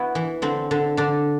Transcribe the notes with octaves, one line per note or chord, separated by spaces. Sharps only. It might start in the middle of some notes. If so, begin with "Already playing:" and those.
Already playing: B3 E4 F#4
E3
D3 C4
D3
D3 D4